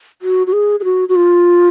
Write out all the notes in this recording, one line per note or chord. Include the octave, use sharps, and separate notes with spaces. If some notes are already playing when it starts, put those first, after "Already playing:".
F#4
F#4
G#4
G#4
F#4
F#4
F4